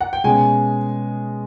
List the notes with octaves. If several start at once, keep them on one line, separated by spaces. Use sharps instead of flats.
F#5
G5
B2 G#3 C#4 G#5